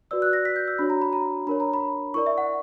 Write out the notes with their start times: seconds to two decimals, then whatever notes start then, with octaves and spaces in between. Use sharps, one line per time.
0.11 F#4 B4 D5 E6
0.22 F#6
0.33 A#6
0.45 B6
0.56 G6
0.68 E6
0.79 D4 F#4 C#5 B5
0.90 A#5
1.02 B5
1.13 A#5
1.47 D4 A#4 C#5 B5
1.60 A#5
1.74 B5
2.14 E4 A#4 D5 C#6
2.26 E5
2.38 F#5